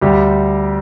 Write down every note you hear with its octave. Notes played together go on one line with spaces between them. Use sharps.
D2 G3 G4